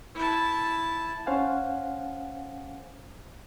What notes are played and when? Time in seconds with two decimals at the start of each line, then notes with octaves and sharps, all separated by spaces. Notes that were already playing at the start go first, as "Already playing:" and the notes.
0.15 E4 A5
1.26 C#4 C5 F5 F#5 G#5